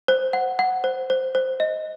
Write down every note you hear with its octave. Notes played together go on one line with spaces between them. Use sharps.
C5
F#5
F#5
C5
C5
C5
D#5